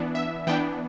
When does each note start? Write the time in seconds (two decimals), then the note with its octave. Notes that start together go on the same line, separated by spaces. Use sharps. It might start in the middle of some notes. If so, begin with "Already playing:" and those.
Already playing: E3 B3 D4
0.15 E5
0.47 E3 B3 D4 G5